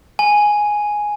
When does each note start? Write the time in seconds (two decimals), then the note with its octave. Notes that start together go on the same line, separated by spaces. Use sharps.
0.19 G#5